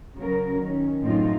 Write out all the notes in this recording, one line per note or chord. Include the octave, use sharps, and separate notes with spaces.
C#3 F#3 A#4
D#3 C#4
F#2 A2 C4 D#4 F4